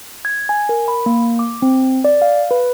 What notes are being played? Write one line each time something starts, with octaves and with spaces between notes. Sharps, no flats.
G#6
G#5
A#4
B5
A#3
D6
C4
D5
F5
B4